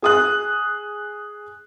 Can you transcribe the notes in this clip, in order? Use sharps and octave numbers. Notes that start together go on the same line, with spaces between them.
G#4 D#6 F#6